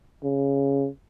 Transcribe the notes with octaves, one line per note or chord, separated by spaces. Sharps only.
C#3